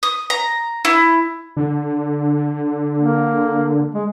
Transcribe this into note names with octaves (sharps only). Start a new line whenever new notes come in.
D#6
A#5
E4
D3
A#3
G#3